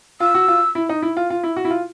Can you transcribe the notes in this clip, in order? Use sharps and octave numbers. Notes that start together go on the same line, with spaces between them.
F4 E6
F#4
F4
E4
D#4
E4
F4
F4
E4
F#4
E4
F4